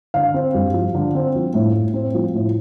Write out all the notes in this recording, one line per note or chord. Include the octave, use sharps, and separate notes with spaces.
D3 F5
C4
G2
F3
D3
C4
F3
A2
A2
C4
F3
A2